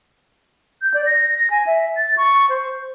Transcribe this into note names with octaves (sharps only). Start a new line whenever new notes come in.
G6
D5
A#6
A#6
G#5
E5
A6
C#6
C5